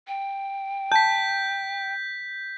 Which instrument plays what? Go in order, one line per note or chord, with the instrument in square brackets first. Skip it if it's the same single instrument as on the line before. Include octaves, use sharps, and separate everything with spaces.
[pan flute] G5
[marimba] A5 [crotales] G6 B6